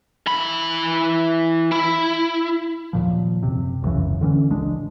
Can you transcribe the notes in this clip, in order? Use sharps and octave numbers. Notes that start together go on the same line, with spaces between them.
E3 B5
E4
D#2 A#2 F3
F#1 C3
E1 C#2 F#2 E3
D3 E3 C4 C#4
G#1 C#2 G#3 D4